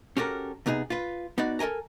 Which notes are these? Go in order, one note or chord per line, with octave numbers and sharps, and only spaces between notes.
C#4 F#4 G4 A4 A#4
C3 B3 D#4 G#4
F4 B4
B3 D#4 F#4 D5
A4 A#4 D#5 G#5 A#5